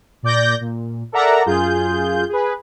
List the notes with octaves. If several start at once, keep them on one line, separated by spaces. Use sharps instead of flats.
A#2 D5 G6 A#6
A#2
A4 A#4 D5 E5 F#5 A#5
F#2 F4 G#4 G6
G#4 B4